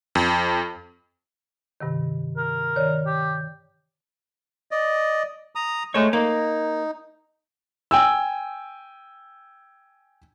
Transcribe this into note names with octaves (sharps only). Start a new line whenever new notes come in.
F2
G2 C3 D#3
A#4
D#3 C#5 D5
G4
D5 D#5
A#5 D#6
G#3 A3 C#5
A#3 D#4
G5 G#5 E6